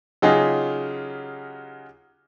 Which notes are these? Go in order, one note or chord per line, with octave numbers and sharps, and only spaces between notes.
C#3 F#3 D#4 F4 G4 G#4